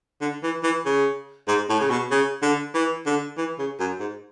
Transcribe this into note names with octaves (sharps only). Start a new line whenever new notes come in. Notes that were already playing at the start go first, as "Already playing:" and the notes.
D3
E3
E3
C#3
G#2
A2
C#3
B2
C#3
D3
E3
D3
E3
C#3
F#2
G#2